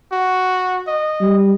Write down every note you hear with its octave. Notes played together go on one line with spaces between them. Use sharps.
F#4
D#5
G3